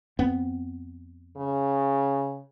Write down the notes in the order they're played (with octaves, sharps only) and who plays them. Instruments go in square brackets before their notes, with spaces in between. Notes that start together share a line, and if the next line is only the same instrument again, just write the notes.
[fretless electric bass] F2 B3 C4
[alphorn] C#3